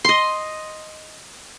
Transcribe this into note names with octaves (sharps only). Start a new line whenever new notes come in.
D#5 C6